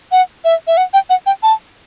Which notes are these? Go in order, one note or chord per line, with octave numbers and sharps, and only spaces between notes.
F#5
E5
E5
F#5
G5
F#5
G5
A5